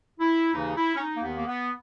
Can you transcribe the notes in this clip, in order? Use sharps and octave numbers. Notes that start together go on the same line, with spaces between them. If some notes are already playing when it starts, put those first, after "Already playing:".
E4
D#2 C#3 E3 D#4
E4
C#4
D#4
A#3
D#2 D#3 B3
A#3
B3